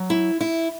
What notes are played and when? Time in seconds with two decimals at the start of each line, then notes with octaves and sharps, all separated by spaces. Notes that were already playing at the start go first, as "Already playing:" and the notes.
Already playing: F#3
0.10 E4
0.41 E4